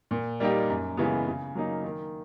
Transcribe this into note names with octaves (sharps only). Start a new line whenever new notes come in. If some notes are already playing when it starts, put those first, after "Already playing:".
A#2
G3 A#3 D#4 G4
F#2
C#3 E3 G#3 B3
C#3
F#3 A#3 D#4
D#3